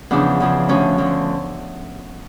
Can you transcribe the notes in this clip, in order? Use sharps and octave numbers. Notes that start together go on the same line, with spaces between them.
E2 C#3 F3 D4
E2 C#3 F3
D2 D3 F3 C#4
D2 D3 F3